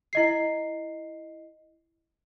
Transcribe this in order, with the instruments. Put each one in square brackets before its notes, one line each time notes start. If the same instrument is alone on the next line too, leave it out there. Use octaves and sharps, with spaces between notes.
[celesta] E4 D#5 C7